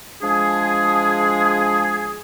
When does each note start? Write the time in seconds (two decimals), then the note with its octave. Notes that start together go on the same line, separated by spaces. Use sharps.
0.22 F3 G#3 D4 G#4